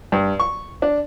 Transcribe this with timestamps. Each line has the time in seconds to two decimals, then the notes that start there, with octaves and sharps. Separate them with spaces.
0.12 G2
0.40 C#6
0.82 D4